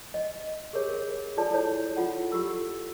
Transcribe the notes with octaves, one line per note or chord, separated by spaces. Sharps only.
D#5
G4 G#4 A#4 C#5
F4 A4 D5 A5
E4 A4 C#5
F4 A4 F#5
F4 G4 A4 E6